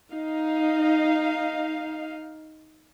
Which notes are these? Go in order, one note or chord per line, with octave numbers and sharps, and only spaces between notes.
D#4 F5